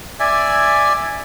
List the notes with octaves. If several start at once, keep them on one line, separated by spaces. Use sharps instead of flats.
D5 E5 G#5